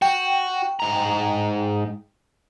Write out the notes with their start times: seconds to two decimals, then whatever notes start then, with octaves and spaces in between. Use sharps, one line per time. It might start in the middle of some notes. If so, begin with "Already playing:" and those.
0.02 F#4 G5
0.80 G#2 A#5